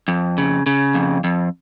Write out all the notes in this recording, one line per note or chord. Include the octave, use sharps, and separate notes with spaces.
F2
C#3
C#3
F2
F2